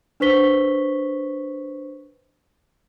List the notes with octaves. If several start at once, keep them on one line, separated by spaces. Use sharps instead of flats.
D4 B4 C5 C#6 B6 G7